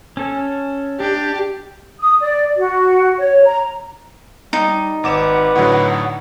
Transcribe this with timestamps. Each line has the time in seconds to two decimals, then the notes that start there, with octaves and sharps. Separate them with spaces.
0.17 C#4 A4
1.00 D4 G4
2.00 D#6
2.20 D5
2.58 F#4
3.18 C#5
3.45 A#5
4.53 G3 D#4
5.04 G#1 B4 F#5 D6 E7
5.56 A2 D3 F#3